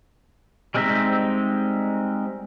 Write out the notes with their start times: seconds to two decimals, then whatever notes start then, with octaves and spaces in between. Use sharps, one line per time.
0.74 G3 G#3 C4 D#4 E5